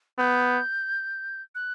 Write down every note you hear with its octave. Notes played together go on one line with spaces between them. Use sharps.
B3 G6
F#6